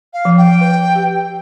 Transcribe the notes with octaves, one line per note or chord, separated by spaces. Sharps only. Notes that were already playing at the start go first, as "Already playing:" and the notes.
F5
F3
G5
B4
G4